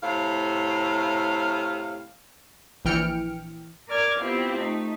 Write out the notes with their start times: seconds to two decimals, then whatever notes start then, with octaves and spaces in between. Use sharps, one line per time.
0.03 A2 C3 F5
2.85 A#1 E3 G5 F6 C#7 D7
3.88 A#4 D5 D6 F6 G#6
4.21 B3 C4 E4 F4 G4
4.57 A3 D#4